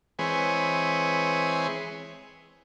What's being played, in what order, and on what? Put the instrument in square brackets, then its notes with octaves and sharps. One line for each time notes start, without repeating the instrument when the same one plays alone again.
[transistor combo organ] E3 G#3 C4 G#4 B4 C#5